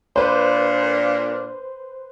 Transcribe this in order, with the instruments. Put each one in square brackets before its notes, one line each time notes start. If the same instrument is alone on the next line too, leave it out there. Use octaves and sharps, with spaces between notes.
[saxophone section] A#2 D4 [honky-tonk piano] B4 C5